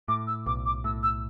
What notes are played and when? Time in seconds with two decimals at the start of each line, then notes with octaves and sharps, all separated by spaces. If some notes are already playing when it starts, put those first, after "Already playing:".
0.08 A2 D6
0.27 E6
0.46 B1 D6
0.66 D6
0.84 A2 E6
1.03 E6